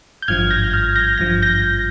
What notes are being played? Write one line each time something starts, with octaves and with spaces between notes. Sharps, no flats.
G6
G#1 G2 F3 F6 G#6
G6 A#6
F6 G#6
G6 A#6
G#1 G2 F3 A#6
G6 A#6